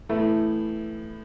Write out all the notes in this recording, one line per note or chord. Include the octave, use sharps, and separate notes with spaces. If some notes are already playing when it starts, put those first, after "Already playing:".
A2 E3 A3 B3 E4